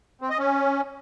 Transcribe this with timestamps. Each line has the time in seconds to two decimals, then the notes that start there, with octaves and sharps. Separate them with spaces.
0.21 C4
0.30 D#5
0.38 C#4